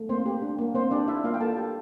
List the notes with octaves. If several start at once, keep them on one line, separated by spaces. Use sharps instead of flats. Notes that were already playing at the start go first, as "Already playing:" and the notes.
Already playing: A3
A#3 C4 C5
G4
D4
A#3
A#3 C4 C5
D4 G4 D5
E4 E5
A#3 F4 F5
G5
A#3 A4 A5
G4